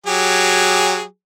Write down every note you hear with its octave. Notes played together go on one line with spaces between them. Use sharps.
F#3 G4 G#4